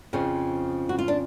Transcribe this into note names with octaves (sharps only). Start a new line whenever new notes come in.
F2 C#3 F3
F#4
F4
D4